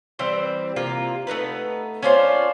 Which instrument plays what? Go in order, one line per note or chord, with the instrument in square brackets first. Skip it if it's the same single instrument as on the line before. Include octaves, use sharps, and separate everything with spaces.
[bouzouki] E3 G3 C4 C5
C3 A#3 F4
A3 B3 D#4 B4
C#4 D4 F4 C5